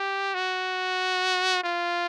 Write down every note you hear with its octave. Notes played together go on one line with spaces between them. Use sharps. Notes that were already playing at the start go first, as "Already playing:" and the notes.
Already playing: G4
F#4
F4